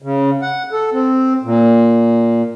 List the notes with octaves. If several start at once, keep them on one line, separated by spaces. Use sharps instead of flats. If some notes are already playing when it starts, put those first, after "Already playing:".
C#3
F#5
A4
C4
A#2